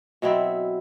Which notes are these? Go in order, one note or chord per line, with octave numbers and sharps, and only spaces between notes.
B2 F#3 C4 E4